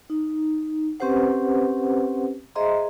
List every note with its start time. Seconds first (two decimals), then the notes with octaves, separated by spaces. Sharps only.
0.10 D#4
1.00 C4 C#4 G4 B4 C5 F#5
2.55 G#4 C5 D#5 E5 A#5 C6